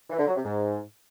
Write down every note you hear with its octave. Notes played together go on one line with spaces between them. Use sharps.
E3
D3
F#3
C3
G#2